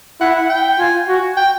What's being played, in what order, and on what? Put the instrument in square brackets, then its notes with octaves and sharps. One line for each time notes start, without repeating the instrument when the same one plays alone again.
[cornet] E4 [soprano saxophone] F#5
[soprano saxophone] F#5
G5
[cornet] F4 [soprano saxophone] G#5
[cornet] F#4
[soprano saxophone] G5